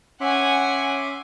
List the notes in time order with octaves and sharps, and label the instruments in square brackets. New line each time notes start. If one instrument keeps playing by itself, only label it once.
[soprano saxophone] C#4 [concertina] E5 C6 D6 [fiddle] F#5 G#5